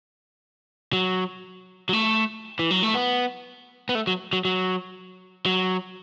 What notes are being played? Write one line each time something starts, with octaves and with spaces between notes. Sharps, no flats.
F#3
F#3
A3
E3
F#3
A3
B3
B3
A3
F#3
F#3
F#3
F#3